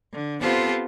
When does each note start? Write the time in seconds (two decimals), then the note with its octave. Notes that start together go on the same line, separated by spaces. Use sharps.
0.13 D3
0.41 B3 C4 F4 G4 A4 C5